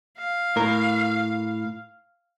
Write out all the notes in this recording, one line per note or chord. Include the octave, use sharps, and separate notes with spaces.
F5
A2 A#4